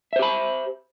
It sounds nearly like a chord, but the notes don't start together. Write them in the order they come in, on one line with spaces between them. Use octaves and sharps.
E5 C5 G4 B5